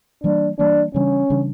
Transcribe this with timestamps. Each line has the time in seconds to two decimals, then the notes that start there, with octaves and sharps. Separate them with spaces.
0.24 E3 G3 A#3 D4
0.59 E3 G3 A#3 D4
0.94 C#3 E3 G3 C#4 D4
1.30 C#3 E3 G3 D4